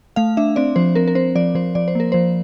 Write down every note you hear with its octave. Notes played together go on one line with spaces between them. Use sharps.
A3 F5
D4 E5
C4 D5
F3 C5
C4 A#4
A#4
C4 C5
F3 D5
F3 C5
F3 D5
C5
A#3 A#4
F3 C5